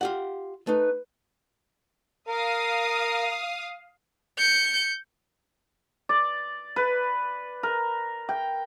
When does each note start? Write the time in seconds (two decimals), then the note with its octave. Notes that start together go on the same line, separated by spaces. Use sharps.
0.01 F4 G4 F#5
0.67 A3 D#4 B4
2.28 A#4 F5 D#6
4.38 G6 C#7
6.09 D5
6.76 B4
7.63 A#4
8.29 G5